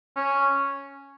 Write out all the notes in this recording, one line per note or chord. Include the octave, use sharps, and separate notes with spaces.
C#4